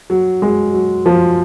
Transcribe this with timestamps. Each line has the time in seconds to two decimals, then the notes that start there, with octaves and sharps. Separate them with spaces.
0.10 F#3
0.42 G#3
0.73 F#3
1.06 F3